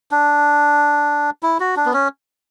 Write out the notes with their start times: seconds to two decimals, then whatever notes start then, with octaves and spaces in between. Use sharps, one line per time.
0.11 D4
1.43 E4
1.60 F#4
1.76 D4
1.86 B3
1.93 C#4